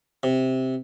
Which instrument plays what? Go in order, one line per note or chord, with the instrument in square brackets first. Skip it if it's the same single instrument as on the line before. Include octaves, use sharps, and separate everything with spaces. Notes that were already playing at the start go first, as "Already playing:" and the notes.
[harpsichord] C3